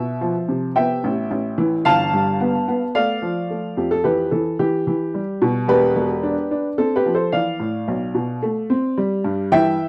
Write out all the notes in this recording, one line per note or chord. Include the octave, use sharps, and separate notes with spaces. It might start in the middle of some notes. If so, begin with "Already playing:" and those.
Already playing: B2 E5
F3
C3
B3 E5 G5
A1
A1
E3
G1 F5 A5
G2
B3
B3
A3 D5 F5
F3
A3
F2 G4
A4
E3 G4 B4
E3 A4
E3 G4
E3
G3
B2
E1 G4 B4
E1
D4
D4
C4 A4
G4 B4
F3
A4 C5
E3 D5 F5
A2
B1
B2
A3
C4
G3
G2
E3 E5 G5